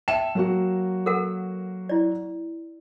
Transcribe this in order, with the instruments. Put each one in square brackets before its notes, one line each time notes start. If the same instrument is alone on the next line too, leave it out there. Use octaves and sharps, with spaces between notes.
[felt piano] E5 E7 [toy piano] G5 A5
[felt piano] F#3 A#3 F#4
[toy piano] A4 A#4 F#5
E4 D5